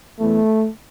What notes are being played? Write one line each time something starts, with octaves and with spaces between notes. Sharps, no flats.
E2 E3 A3